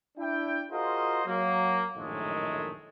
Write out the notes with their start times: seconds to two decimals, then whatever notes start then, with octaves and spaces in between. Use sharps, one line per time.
0.18 D4 E4 G5
0.71 F4 F#4 G#4 A#4 C5 D#5
1.27 F#3 A#3
1.96 A#1 F#2 A2 D#3 G#3 A3